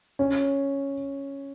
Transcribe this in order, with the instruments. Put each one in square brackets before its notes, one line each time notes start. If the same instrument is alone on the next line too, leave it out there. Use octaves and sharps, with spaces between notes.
[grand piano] C#4